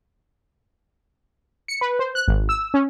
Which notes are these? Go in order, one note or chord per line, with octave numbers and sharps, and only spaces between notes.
C#7
B4
C5
F#6
G#1
E6
C#4